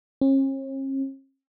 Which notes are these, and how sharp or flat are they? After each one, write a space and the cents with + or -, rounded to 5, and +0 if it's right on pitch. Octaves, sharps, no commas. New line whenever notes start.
C#4 -45